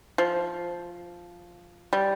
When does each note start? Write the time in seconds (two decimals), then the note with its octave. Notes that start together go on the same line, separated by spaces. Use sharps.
0.18 F3
1.93 G3